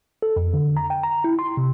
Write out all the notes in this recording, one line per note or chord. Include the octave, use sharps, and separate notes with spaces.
A4
F2
D3
A#5
G5
A#5
E4
C6
C3